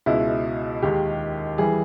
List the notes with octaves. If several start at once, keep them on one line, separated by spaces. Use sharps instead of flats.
C#2 B2 G#3 E4
D#2 D#3 G#3 G4
E3 G3 G#4